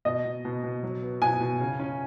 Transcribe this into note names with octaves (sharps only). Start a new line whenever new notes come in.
B2 D#5
B2
B2
B2
F#3
B3
B2 G#5
B2
C#3
C#4